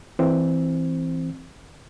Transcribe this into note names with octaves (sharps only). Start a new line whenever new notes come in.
E3 C4